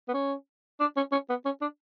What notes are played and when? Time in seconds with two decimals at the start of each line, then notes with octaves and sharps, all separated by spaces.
0.08 B3
0.14 C#4
0.80 D4
0.97 C#4
1.12 C#4
1.29 B3
1.45 C#4
1.61 D4